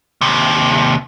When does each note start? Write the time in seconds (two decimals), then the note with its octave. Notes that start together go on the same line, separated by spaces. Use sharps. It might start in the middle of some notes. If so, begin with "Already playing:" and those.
0.21 D#2 C3